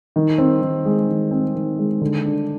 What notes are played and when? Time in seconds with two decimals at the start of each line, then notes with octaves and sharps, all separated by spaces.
0.16 D#3
0.38 C4
0.61 D#3
0.85 G#3
1.09 D#3
1.31 C4
1.55 D#3
1.79 G#3
2.01 D3
2.25 D4